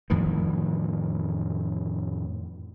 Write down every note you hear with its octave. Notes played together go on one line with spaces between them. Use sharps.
F2 A2 D#3 E3